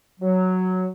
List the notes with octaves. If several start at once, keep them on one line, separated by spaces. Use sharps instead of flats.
F#3